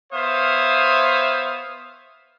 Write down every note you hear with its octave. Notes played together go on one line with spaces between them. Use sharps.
B3 C5 C#5 E5 F5 D#6